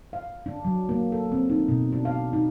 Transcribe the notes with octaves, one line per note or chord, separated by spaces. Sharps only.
F5
D4
F#3
A#3
A4
C4
D#4
B2
D4
F5
D#4